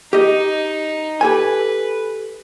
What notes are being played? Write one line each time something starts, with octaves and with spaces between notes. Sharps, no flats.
D#4 G4 D#5
G4 A4 B4 G#5